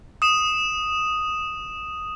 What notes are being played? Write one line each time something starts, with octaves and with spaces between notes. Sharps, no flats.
D#6 E7